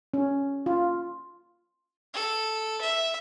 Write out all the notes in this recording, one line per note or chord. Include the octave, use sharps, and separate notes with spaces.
C#4
F4
A4
E5